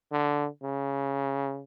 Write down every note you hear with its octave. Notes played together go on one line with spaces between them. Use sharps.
D3
C#3